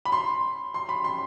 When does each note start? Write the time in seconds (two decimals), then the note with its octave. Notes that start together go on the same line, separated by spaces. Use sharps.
0.05 B5
0.12 C6
0.74 C6
0.89 B5
1.04 C6